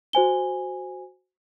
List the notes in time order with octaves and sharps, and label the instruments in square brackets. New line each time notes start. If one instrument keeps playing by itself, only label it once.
[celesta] F#4 C5 G#5 G7